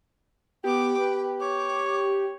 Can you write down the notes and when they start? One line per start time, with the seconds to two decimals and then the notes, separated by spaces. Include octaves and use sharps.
0.64 B3 G4 G5 D6
1.00 B4
1.40 C#5 D6